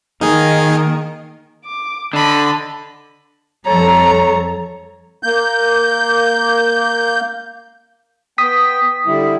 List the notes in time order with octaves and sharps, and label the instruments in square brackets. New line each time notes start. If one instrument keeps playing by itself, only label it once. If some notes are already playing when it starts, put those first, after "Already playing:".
[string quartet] D#3 [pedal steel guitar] A#3 [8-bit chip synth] D#4 G#4
[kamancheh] D6
[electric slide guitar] D3 [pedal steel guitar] D4 [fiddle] D#5 B5 [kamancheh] A5
[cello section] F2 G3 A4 [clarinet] C#5 [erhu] A#5
[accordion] A#3 G6
[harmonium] B3 G5 [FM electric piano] D#6 B6
[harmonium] D3 G3 E4